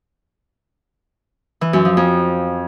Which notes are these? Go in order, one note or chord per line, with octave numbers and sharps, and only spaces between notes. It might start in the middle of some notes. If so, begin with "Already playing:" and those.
E3
F#2
F3
F2